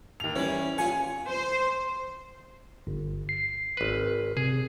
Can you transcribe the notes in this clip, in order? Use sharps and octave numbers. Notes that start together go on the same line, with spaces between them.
D#2 F7
E3 G3 C#4
A#2 F4 G#5 C#6
C5
G1
C7
G#1 B4
C3 G#4